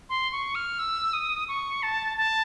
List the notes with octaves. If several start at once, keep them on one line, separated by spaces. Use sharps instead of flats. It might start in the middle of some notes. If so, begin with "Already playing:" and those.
C6
C#6
F6
E6
D#6
C#6
A5
A5